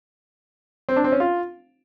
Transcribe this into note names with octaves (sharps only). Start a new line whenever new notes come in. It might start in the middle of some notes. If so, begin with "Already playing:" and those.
C4
D4
C4
C#4
F4